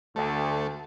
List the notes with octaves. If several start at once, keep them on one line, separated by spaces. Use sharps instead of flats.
D2 A3